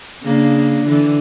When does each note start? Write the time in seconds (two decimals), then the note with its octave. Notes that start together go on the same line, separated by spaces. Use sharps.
0.22 C#3 A#3 D4
0.84 D3 E3